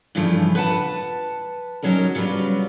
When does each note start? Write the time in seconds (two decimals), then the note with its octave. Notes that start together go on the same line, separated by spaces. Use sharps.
0.15 G2 C#3 E3 F3 G3 A3
0.55 B4 F#5 A5
1.83 F#3 C#4 D#4 A#4
2.15 C#3 F#3 G3 B3 F4